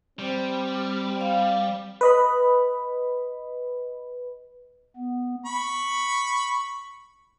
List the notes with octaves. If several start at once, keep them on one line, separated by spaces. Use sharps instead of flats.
G3 C4
F5
B4 D#5 B5
B3
B5 C#6